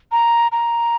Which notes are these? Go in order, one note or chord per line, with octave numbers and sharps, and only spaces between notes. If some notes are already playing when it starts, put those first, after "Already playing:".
A#5
A#5